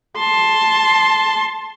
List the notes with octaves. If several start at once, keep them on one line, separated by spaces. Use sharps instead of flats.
A5 C6